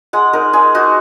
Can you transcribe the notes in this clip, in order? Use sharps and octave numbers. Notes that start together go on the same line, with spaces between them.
G#3 F#5
D#4 A#4
G#3 G#4
D#4 F#4